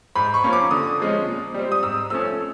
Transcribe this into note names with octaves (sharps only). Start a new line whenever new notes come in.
G#2 B5
C#6
F3 A#3 C#4
D6
D3 D#6
F3 G#3 C#4
A#2
G3 C4
D#6
G#2 E6
F3 A3 C#4 E6